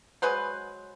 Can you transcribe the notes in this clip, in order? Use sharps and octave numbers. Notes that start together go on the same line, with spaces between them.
F#3 G#3 B4 C5